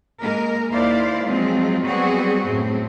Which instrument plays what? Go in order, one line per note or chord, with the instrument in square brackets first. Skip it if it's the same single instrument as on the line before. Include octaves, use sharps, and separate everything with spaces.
[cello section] G#3 A#3 A#4
D#2 A#3 E4 C5 D5 F5
F3 F#3 G#3 C4 F4
F#3 G3 B3 C4 F#4 G#4
F#2 A2 C4